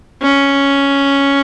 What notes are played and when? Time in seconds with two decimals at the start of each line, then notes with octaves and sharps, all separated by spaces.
0.22 C#4